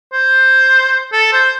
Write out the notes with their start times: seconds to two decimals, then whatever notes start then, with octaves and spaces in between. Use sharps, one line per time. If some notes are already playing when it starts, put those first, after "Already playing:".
0.13 C5
1.13 A4
1.33 C5